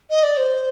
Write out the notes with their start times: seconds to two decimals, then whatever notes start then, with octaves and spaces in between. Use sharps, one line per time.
0.10 D#5
0.23 D5
0.37 C5